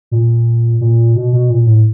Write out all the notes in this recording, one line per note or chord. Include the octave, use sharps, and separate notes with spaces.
A#2
A#2
B2
B2
A#2
A2